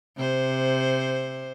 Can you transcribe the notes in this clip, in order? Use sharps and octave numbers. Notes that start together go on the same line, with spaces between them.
C3 C5